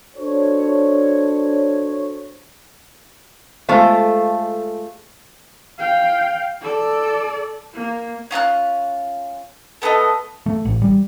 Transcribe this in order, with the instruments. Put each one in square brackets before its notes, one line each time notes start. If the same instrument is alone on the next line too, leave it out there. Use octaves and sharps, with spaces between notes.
[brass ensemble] D4 F#4 A4 C5 C#5
[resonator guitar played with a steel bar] G#3 A3 F4 A4 C5 F5
[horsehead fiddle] F5 G5
A4 D5
A#3
[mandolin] C#4 F4 A5 F#6
A3 B3 A4 D#5
[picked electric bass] A3
A1
G3